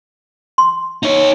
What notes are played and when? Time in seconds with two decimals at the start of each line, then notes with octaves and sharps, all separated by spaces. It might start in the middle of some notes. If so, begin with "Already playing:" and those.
0.58 C6
1.03 D#4 C#5